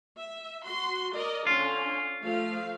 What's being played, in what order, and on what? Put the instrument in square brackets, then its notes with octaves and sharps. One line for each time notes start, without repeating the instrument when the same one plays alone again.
[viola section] E5
F#4 C6
A#4 D5 D#5
[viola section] D3 C#4 D4 [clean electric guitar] F4
[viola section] F3 A3 F5